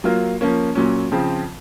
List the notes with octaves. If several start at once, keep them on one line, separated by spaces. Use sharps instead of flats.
F#3 A#3 F4
F3 A#3 C#4
A#2 F#3 C#4
C#3 F3 C4